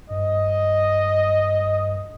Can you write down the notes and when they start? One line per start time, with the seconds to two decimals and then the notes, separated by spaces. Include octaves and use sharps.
0.10 G2 D#5